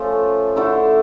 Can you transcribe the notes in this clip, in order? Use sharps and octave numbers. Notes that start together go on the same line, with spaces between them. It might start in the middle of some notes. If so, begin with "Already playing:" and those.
Already playing: F3 A3 C#4 F4
D3 A3 E4